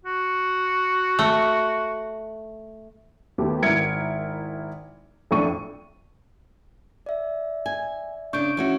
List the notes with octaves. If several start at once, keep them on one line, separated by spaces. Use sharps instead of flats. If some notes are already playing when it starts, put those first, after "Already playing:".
F#4
A3
D#2 A3 B3 G4
G#1 E4 A#4 G#6 C#7 D7
B1 F2 A2 D4 C#6 D#7
D5 E5
G#5
C#3 D4 C#6 G6 D7
E3 C#4 F#4